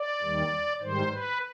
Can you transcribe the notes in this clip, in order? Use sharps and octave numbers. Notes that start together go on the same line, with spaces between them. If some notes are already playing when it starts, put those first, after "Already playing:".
Already playing: D5
D#2 D#3 G3
G#2 D#3 G3 C5
B4